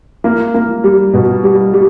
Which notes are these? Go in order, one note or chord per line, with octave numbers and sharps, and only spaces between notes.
A#3
A#3
G3
B2
G3
G3